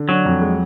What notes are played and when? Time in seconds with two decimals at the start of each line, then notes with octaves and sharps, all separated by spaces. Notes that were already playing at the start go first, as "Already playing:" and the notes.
Already playing: D3
0.09 F#3 D4
0.25 F2
0.42 G#3